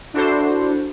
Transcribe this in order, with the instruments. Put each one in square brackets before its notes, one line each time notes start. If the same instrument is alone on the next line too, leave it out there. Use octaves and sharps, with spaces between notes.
[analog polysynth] D4 E4 F#4 A4 C5